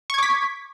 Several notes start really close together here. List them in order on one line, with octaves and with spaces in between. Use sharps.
C#6 G#6 D6 B6